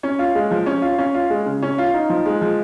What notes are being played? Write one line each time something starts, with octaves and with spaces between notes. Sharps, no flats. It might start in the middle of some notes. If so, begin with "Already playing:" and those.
C#4
F4
G#3
F3
C#4
F4
C#4
F4
G#3
C#3
C#4
F4
D#4
F3
G#3
F3